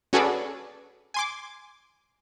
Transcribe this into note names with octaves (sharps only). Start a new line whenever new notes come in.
C#4 F#4 G#4 A4 B4 D5
G#5 C6 D6